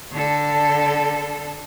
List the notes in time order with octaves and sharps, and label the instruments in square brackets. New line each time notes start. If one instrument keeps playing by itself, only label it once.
[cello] D3 A4